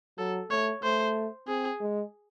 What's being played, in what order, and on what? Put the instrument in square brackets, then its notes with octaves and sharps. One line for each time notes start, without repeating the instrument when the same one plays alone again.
[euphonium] F#3 [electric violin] A4
[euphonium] A3 [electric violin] C#5
[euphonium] A3 [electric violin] C5
[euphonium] C4 [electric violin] G#4
[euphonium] G#3